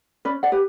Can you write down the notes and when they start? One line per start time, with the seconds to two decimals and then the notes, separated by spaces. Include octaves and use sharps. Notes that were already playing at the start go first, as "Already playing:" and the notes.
0.25 C#4 B4 D5
0.43 D5 F#5
0.52 G4 B4